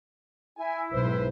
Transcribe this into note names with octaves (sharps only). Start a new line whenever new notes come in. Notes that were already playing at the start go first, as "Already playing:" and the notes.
E4 G#5
B1 G#2 B4 C5